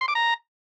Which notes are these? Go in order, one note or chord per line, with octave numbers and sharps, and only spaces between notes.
C6
D6
A#5